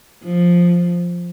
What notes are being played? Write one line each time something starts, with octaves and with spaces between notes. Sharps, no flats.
F3